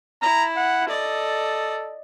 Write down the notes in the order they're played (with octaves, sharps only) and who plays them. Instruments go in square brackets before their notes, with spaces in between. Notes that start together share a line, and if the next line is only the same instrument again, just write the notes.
[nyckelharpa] E4 [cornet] A#5
[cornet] F#5
[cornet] A4 [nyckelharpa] D5 D#5